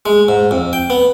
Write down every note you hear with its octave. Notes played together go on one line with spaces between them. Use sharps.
G#3
G#2
F2
G5
B3